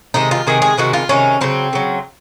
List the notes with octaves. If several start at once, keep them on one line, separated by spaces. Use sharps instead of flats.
C3 D#3 G#3 D#4
F4
C3 D#3 G#3 G#4
G#4
C3 D#3 G#3 F#4
F4
C3 D#3 G#3 C#4
C#3 F#3 C4
C#3 F#3